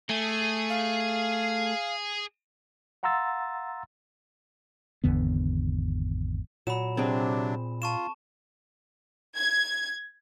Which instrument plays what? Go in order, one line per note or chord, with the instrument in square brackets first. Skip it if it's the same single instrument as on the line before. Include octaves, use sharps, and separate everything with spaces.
[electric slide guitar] A3 [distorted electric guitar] G#4 G#5
[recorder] F5
[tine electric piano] F5 F#5 A#5 C6 E6 A6
[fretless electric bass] G#1 E2 D3 B3
[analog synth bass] A#2 [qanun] F#3 [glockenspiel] B5 E7
[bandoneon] C3 F#3 D4 [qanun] C4 G#4 G5
[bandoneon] F4 [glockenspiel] A5 C#6 E7
[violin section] G#6